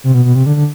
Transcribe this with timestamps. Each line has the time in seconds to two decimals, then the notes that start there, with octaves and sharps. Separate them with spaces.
0.04 C3
0.14 B2
0.25 B2
0.35 C3
0.46 D3
0.56 D3